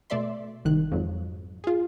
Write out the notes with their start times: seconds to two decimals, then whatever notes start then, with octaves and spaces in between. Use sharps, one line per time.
0.10 B2 A3 D5 E5 C6
0.65 G1 C2 D#3 F#6
0.92 F2 G#2 F#3
1.64 F4 G#4